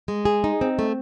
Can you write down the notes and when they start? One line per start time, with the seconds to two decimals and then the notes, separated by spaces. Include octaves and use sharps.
0.08 G#3
0.25 G#4
0.44 D#4
0.61 C4
0.79 A3